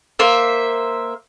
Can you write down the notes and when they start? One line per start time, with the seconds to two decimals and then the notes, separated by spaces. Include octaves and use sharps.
0.19 A#3 C5 E5